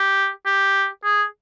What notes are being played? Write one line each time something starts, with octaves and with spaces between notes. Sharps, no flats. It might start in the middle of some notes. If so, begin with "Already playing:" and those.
Already playing: G4
G4
G#4